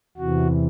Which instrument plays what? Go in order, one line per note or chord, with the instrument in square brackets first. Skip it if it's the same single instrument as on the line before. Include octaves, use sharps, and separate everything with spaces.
[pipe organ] E2 C3 E3 F#4